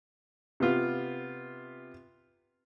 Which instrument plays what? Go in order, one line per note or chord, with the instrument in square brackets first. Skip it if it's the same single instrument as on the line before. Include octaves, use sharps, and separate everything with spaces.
[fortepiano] C3 B3 F4